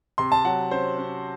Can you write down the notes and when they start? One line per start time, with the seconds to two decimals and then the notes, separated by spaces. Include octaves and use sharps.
0.18 C3 C6
0.32 A5
0.45 F#3 F#5
0.71 C#4 C5
0.98 C#4